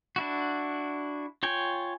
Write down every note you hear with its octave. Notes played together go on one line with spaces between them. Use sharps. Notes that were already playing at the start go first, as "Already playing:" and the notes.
D4 E4 F#4
F4 C#5 G5 G#5